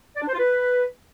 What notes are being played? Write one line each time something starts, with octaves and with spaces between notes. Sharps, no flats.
D5
D4
C5
F4
B4